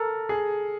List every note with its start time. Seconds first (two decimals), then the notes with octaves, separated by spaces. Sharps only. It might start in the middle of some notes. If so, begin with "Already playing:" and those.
Already playing: A4 A#4
0.29 G#4